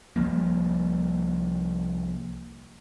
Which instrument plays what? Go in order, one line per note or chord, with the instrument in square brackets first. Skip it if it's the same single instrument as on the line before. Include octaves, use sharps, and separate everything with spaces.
[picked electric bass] C2 F3 G3 A#3